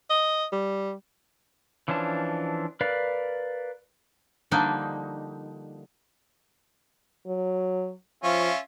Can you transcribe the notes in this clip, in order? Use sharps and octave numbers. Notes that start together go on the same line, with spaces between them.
D#5
G3
E3 F3 C#4 D4 A5
A#4 B4 D5 F5
D3 F3 G3 A#3 D4 D#4
F#3
F3 C#4 F4 E5